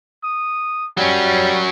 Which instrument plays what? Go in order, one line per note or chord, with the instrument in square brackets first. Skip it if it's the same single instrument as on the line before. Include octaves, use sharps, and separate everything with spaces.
[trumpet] D#6
[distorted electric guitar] F#3 C#4 [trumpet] G3